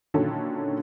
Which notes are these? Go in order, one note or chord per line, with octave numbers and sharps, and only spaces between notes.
A#2 D3 D#3 F#3 C#4 A4